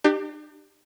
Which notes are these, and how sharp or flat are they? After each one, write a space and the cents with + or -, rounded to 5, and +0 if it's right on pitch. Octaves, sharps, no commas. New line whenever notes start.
D4 +45 G4 +5